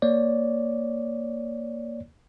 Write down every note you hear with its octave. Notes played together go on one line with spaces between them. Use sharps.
A#3 C#5 D5